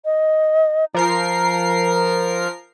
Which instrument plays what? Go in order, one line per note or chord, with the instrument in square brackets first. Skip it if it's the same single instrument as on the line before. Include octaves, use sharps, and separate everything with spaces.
[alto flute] D#5
[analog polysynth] F3 A#4 C7 [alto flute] A#5